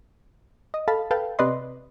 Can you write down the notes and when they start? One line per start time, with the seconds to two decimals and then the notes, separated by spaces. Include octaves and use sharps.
0.74 D#5
0.88 A4 F5 A5 B5
1.11 A4 B4 F5 G5 A5
1.39 C3 B4 D5 D#5 C6